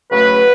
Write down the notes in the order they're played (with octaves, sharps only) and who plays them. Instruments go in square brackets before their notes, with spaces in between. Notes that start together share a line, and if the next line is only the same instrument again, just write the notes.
[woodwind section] C#3 F#3 A3 B4